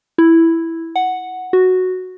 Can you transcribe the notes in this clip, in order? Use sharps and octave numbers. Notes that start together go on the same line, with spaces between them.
E4
F#5
F#4